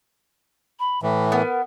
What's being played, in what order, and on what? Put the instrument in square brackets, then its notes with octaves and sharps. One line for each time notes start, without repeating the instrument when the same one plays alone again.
[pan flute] B5
[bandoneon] A2 E3 [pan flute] E5
[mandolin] B3 [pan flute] A#4